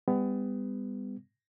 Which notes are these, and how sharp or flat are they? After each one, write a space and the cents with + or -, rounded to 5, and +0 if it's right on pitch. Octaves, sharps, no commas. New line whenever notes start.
G3 +40 B3 +25